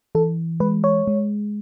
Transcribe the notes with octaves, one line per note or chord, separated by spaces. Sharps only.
E3 A4
G#3 B4
C#5
G#3